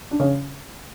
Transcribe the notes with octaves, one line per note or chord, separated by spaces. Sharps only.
D4
C#3 C#4